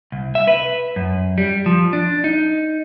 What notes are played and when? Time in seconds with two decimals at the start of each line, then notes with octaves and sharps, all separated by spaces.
0.12 C2
0.35 E5
0.48 B4
0.96 F#2
1.38 G3
1.66 F3
1.93 D4
2.24 D#4